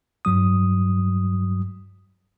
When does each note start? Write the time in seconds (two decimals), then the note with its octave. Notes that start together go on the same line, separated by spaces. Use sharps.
0.25 G2 F#3 D#6